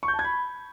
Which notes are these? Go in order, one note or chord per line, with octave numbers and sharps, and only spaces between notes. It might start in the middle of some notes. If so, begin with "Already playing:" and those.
C#6
G6
A5
G#6
B5